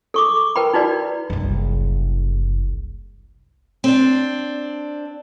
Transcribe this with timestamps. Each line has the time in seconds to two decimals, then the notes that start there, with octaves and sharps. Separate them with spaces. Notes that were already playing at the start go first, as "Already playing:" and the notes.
0.14 A4 C#6 D6
0.56 A#4 B4 G5 B5
0.73 D#4 E4 F#4 B4 D5
1.30 F#1 C2
3.84 C4 D4